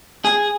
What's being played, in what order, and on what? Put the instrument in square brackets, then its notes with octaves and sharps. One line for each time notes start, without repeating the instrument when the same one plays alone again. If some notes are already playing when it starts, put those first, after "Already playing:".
[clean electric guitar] G#4